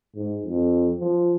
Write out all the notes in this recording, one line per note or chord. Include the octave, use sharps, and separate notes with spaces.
G#2
F2
F3